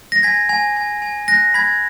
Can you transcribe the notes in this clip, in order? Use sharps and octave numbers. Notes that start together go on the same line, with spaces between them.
A#6
G#5 G#6 B6
G#5
G#5
G#5
F#6 A#6
B5 G#6 B6